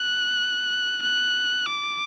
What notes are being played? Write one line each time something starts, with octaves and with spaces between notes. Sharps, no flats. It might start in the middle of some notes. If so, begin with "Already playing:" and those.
Already playing: F#6
F#6
D6